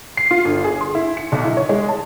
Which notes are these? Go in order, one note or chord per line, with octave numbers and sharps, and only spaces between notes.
C7
F4
G1
G#4
C6
E4
C#7
B1
E4
C#5
G#3
A5